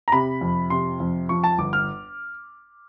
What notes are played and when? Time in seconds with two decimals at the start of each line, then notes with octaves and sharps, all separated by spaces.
0.08 A#5
0.12 C3 B5
0.41 F2
0.70 C3 C6
1.00 F2
1.29 F3 C#6
1.44 A5
1.58 G1 D6
1.73 F6